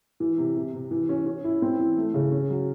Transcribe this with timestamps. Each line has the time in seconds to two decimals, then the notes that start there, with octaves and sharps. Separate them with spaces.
0.20 E3
0.38 C3
0.56 C3
0.73 C3
0.91 E3
1.09 C#4
1.26 C#4
1.44 E4
1.62 C4
1.79 E3
1.97 A3
2.14 C#3
2.32 C#4
2.50 F#3